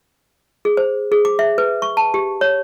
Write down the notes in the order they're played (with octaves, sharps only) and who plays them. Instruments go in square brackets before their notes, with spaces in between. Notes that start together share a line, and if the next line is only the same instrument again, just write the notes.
[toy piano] G#4
C5
G#4
D6
E5
B4
C#6
A5
G4
C#5